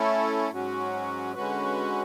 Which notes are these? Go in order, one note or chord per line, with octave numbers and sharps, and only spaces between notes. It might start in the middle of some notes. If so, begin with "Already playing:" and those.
Already playing: A3 C#4 E4 A4
G#2 F#3 C#4 F#4
D3 G#3 C#4 F#4 B4